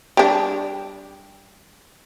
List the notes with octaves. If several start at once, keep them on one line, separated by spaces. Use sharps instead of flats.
G3 D4